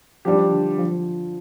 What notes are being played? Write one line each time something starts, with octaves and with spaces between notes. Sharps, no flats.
F3 G3 D4 G4
D3
F3